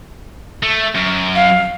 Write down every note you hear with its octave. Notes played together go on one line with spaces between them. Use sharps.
A3
F#2
F5